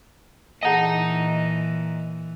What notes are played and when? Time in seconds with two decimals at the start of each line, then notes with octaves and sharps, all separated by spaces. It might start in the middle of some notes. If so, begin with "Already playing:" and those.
0.63 A#2 E3 G#4 D#5 F#5 A5 A#5